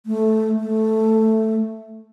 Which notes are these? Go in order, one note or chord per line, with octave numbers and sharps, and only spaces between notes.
A3
A3